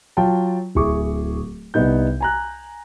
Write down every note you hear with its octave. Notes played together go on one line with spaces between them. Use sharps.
F#3 F4 G5 A5
D1 E4 G#4 C#6 D6
C2 C3 B3 D#4 G6
G#5 A#5 F#6